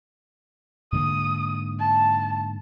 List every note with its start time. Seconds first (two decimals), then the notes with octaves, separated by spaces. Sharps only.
0.92 G#2 D3 A#3 D#6
1.79 A5